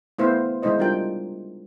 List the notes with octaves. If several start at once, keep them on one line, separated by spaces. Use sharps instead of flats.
A3 B3 E4 C5 E5 F5
G#3 D#4 E4 C5 D#5
G3 D4 F4 A#4 C5 G5